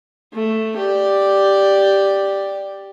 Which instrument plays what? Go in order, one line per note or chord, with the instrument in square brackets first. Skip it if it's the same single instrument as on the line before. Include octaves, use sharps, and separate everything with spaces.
[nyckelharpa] A3
G4 D5